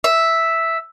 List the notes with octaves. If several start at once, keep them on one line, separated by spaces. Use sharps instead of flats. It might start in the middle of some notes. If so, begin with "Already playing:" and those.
E5